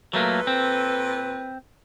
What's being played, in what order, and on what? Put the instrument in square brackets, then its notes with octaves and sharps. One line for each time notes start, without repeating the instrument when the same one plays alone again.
[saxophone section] A#2 A4 B4 [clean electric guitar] F#3 A3 A#3
[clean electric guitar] C4